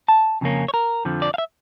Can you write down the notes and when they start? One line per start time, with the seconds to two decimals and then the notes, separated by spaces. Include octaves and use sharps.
0.08 A5
0.41 F2 C#3 A#3 C#4
0.68 C#5
0.74 A#4
1.05 F2 D3 F3
1.22 D5
1.34 F5
1.38 E5